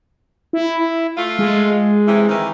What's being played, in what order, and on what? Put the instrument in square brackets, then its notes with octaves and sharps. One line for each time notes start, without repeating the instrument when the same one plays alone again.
[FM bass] E4
[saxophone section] A3 F4
[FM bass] G#3
[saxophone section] C3 E3
D#3 E3 C4